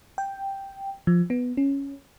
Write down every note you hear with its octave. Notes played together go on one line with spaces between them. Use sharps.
G5
F3
B3
C#4